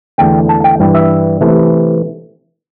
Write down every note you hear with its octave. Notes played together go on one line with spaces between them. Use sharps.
E2 D3 A3 D4 G5
A5
G5
G2 E3 G3
E5
C3 E3 A3